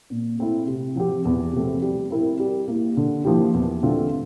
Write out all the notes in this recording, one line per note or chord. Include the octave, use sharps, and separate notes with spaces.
A#2
A3 C4 E4
C3
F3 C4 G4
E2
C3 F3 A3 C4
G3
C4 E4 A#4
G3
A#3 E4
D3
F3 A#3 E4 G4
E2
D3 A3 C4 F4